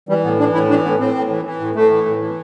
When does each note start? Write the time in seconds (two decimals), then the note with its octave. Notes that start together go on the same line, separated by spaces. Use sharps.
0.09 E3 G3
0.24 A2 B3
0.39 E3 D4
0.54 A2 E4
0.69 E3 D4
0.84 A2 B3
1.00 A2 C4
1.15 A2
1.30 E3
1.45 E3
1.60 A2
1.75 A2 A3
1.90 E3
2.06 A2
2.21 E3